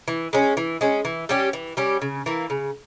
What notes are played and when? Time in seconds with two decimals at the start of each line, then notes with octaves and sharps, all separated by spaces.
0.08 E3
0.33 G#3 C#4
0.57 E3
0.81 G#3 C#4
1.05 E3
1.29 G3 C#4 G4
1.53 E3
1.77 G3 C#4 G4
2.02 C#3
2.26 E3 A#3
2.50 C#3